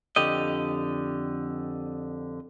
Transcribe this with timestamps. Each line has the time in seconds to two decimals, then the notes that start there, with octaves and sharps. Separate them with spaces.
0.16 F2 D3 G4 D#5